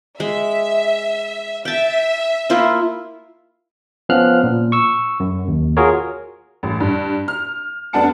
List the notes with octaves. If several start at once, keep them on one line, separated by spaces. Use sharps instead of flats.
G#3 E5
E5 G5 A5
A#3 E4 F4
F3 B3 C#4 F5 F6 F#6
A#2
C#6 E6
F#2
D#2
F4 F#4 G#4 A#4 C#5
A1
G2
F6
F1 B3 D4 F#5 A5 C#7